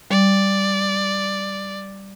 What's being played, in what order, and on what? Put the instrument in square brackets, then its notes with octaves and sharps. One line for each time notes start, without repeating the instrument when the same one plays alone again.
[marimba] G3 [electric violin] D5